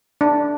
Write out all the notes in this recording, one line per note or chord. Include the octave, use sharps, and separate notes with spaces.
D4